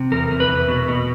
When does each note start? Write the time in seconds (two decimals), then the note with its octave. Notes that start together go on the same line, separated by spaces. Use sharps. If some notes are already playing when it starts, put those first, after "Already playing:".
Already playing: C3
0.12 E2 A#4
0.31 E2
0.40 B4
0.49 E2
0.68 B2
0.88 B2